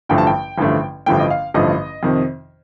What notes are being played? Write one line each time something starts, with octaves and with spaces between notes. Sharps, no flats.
A1 G2 D3 F3 A3 G5
A5
G5
A1 G2 D3 F3 A3
A1 G2 D3 F3 A3 G5
D#5
F5
A1 G2 D3 F3 A3 D#5
F2 C3 D#3